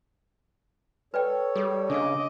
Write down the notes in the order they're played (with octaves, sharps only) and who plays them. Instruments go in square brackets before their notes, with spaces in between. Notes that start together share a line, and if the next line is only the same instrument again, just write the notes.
[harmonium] A4 C#5 [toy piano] B4 D5 G5
[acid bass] G3 [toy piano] G#4
[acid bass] C#3 [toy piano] D4 F5 [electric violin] D#5 D6